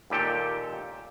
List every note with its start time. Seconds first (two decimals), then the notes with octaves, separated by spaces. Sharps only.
0.10 D#2 A#2 G4 A4 G5